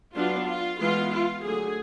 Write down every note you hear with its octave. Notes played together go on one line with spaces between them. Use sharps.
F#3 B3 D4 F4
F4
E3 G#3 B3 F4
F4
D3 F#3 A3 G#4